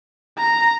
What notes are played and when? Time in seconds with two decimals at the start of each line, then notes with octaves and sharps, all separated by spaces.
0.38 A#5